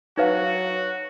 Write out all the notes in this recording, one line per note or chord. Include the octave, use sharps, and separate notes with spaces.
F#3 D#4 F#4 B4 F5